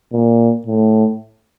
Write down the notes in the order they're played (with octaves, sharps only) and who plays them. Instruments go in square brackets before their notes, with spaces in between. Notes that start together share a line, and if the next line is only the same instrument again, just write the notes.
[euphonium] A#2
A2